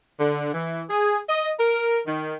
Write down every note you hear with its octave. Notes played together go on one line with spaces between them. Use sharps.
D3
E3
G#4
D#5
A#4
D#3